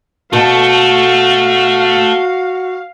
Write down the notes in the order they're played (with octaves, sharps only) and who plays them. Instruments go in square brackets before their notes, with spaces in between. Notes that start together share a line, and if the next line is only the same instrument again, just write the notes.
[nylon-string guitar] B2 A4 [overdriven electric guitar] A3 [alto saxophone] F#4 [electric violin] F5